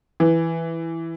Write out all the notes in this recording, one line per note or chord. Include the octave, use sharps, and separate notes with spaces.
E3